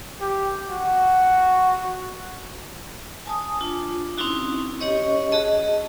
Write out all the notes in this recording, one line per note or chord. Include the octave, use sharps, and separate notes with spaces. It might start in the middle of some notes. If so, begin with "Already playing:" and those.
G4
F#4
G#5 A5 D#6
D4 F4
C4 C#4 D#4 E4 F#4
C#4 G4 C#5 D#5 C#6
F#4 G#4 D#5 A5